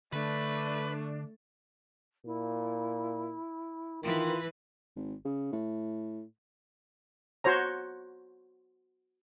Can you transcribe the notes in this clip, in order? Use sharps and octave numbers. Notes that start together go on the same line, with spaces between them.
D3 A3 D4 B4
A#2 E4
D#3 E3 F4 B4
G#1
C#3
A2
F#4 C5 C#5 A#5